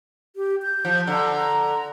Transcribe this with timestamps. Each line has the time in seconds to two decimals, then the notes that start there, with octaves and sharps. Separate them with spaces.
0.36 G4
0.63 G6
0.85 F3
1.07 D3 A#5
1.35 A#5